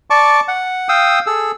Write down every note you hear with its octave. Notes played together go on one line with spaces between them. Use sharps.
D5 A5 C#6 D6
F#5
F5 G5 D#6 E6
G#4 A4 E6